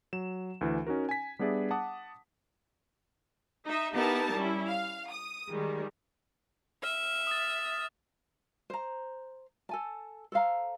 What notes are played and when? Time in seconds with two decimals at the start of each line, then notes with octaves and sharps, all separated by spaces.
0.13 F#3 E7
0.61 D2 E3
0.87 C#4 D#4 F#4 A#4
1.09 G#5 B6
1.39 G3 B3 D4 G#4 D5 E5
1.71 F#5 A5 D6 D#6
3.65 D#4 E5
3.94 B3 D#4 E4 G4 A#4 A5
4.34 G3 C#4 E4
4.67 F5
5.11 D#6
5.48 D#3 G3 G#3
6.83 E5 F6
7.27 D#6 A6
8.70 C5 A#5
9.69 A4 G#5 A5
10.32 A4 C5 F5 A#5